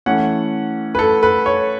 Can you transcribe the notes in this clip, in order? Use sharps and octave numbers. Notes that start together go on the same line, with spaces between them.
E3 A3 C#4 F#5
B4
A4
B4
C#5